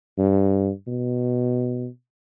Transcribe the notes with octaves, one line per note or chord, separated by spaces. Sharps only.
G2
B2